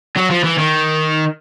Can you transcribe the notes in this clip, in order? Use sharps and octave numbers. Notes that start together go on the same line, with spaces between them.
F#3
F3
E3
D#3